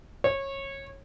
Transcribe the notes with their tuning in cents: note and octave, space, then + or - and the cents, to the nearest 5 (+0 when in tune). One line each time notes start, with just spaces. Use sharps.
C#5 -20